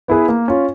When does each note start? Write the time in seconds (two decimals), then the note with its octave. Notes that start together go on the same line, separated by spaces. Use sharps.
0.08 B3 E4 G#4 B4
0.29 A#3
0.48 C#4 F4